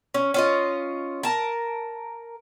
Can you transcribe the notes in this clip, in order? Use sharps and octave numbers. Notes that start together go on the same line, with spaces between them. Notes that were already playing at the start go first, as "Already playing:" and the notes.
C#4
C#4 F4 D#5
A#4 A5